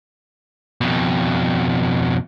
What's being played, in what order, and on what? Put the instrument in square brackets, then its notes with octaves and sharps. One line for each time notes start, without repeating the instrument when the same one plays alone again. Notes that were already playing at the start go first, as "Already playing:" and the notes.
[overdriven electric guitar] F2 B2